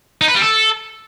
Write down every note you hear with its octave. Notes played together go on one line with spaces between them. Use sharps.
D#4
B4
G3
A4